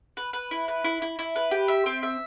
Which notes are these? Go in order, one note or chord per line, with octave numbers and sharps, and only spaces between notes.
B4
B4
E4
B4
E4
E4
E4
B4
G4
E5
C4
E5